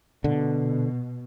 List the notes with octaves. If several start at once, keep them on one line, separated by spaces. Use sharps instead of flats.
B2 D3